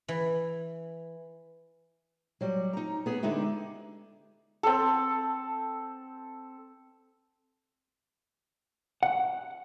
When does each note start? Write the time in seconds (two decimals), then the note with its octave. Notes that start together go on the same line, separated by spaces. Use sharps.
0.08 E3
2.41 F#3 G3
2.73 D#4 A#5
3.06 B3 G#4
3.23 D3 G#3 D#4 E4 G4
4.63 C4 A4
9.03 F#5